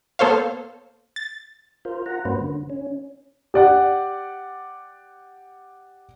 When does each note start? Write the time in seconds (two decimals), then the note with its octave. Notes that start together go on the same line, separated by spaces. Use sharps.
0.19 A#3 B3 A4 C5 C#5 F5
1.16 A6
1.85 F4 A#4 C5
2.06 F4 F#5 A#5
2.25 G2 A#3 C#4 F#4 B4 C5
2.41 D3
2.70 C#4
3.54 G4 D5 F#5